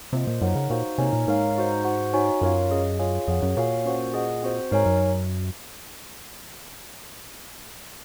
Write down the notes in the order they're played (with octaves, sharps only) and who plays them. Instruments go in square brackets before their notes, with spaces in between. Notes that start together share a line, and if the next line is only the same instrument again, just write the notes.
[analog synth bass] C3 [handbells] A#3 F4 C5 D#5
[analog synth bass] A#2
[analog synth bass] F#2 [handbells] D#4 A#4 C#5 F#5
[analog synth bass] C#3
[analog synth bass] A#2 [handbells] D#4 F#4 C5 F5
[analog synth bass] C3 [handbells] A#3 D#4 A#4 C#5 G#5
[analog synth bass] A#2
[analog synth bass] G#2 [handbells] D#4 A#4 C#5 F5
[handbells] D#4 F#4 C5
F#4 C5 F#5
D#4 F#4 C#5 G#5
[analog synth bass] F#2 [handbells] F4 A#4 C#5 F5
[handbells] C#4 G#4 D#5
F4 G#4 C#5 F5 G#5
[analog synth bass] F2 [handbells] G#4 C#5 F#5
[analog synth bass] F#2
[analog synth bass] A#2 [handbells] F#4 C#5 F5 G#5
[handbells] C#4 F#4 C5 F#5
G#4 D#5 F#5
C4 F#4 C5
[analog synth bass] G#2 [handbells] D#4 A#4 C#5 G#5
[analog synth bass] F#2